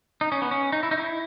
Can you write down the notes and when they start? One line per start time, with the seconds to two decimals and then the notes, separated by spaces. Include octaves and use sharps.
0.21 D#4
0.32 C#4
0.42 B3
0.51 C#4
0.72 D#4
0.83 E4
0.91 D#4
0.98 E4